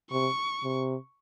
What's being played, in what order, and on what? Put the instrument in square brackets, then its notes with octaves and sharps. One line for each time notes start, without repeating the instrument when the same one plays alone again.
[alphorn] C3 [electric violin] C#6
[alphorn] C3